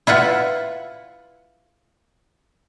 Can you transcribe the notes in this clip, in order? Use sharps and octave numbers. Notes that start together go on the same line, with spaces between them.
E4 F4 B4 F#5